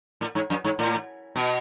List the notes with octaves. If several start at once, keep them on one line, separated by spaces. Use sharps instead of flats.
A2
G#2
F#2
G#2
A2
B2